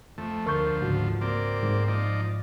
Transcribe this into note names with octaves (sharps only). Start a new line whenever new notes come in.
F2 A3
D2 F3 A#4 C#6 G6
C#2 G#2 F#4
A#3 C4 D5
G#2
F3 D#4 D5